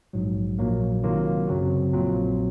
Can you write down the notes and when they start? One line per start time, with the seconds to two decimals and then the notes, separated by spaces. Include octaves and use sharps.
0.13 A#1 G#2 F#3
0.59 A#1 A#2 F#3 A#3
1.03 C3 D#3 F#3 A#3 F4
1.47 F#2 C#3 F#3 C4 F#4
1.93 A#1 A#2 F#3 C4 F4